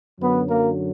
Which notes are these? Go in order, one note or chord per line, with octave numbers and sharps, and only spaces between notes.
F#2 D3 F#3 B3 B4
A#3 A#4